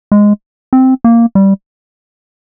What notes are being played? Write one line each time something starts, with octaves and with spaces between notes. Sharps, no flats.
G#3
C4
A#3
G3